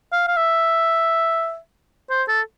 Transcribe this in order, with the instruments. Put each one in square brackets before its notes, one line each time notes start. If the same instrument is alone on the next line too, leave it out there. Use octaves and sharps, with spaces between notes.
[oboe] F5
F5
E5
C5
A4